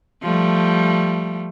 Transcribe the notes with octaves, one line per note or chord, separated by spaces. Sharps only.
F3 G3 A3